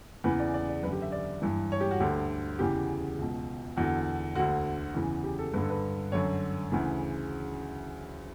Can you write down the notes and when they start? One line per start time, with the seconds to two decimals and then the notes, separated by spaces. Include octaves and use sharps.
0.24 E2 C#3 E3 B4
0.40 D5
0.54 D5
0.69 D5
0.83 F#2 B4
0.87 D3
0.92 G4
1.02 E5
1.12 D5
1.42 G2 E3
1.72 C#5
1.81 G4
1.91 F#4
2.00 D2 D3 G4
2.59 E2 C#3 E3 G4
3.18 C#2 B2
3.77 E2 D3 F#4
4.35 D2 D3 F#4
4.94 E2 C#3 E3
5.24 G4
5.39 A4
5.54 G2 D3 B4
5.62 A4
5.70 B4
6.12 F#2 D3 C#5
6.72 D2 C#3 E3